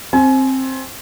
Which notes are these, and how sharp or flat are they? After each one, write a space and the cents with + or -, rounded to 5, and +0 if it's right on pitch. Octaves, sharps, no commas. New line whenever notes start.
C4 +15 G#5 +30